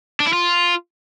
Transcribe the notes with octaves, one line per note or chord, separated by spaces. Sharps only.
D4
E4
F4